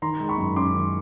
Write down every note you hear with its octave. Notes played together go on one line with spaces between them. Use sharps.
D#3 A#5 C6
G#3
B5 C#6
F#2
C#4 C6 D6
D#3